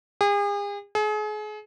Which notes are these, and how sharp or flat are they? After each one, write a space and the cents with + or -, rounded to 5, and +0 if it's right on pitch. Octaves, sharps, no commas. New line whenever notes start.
G#4 -40
G#4 +35